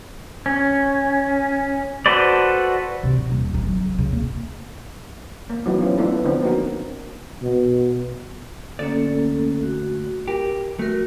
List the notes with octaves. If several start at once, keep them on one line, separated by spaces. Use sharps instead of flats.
C#4
F#4 A4 B4 C5 D5
C3
D#4
D#1
D#4
F#3
C#3
C#3
A#3
A#3
E3 F#3 A3 B3 D#4
C4 C#4 E4 F4
A3 B3 D4 E4 F4 A4
D3 F3 B3 C4 D4
A#3 D#4 F#4 A#4
B2
D2 A#3 C#4 A4 D5
F#4
G4 A#4
A3 F#4 A#4